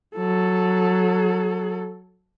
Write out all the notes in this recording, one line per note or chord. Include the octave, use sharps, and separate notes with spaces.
F#3 A4